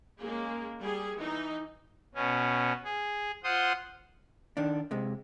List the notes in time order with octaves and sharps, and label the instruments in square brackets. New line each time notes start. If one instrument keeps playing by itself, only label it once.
[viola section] G#3 A#3 C#4 G#4
G3 G#4
E3 D#4
[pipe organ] B2 C#4
G#4
F4 C5 F#5 C6 D#6
[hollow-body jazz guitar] D#3 D4
C3 G#3